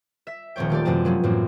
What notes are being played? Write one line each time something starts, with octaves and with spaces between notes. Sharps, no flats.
E5 B6
D#1 F3 C4 C#5 G5
D#3 A3 G4 D5
F#2 C3 E3 F3 C4 A5
F3 F#3 A#3 C#4
F#2 A2 E3 F#3 A#3 C4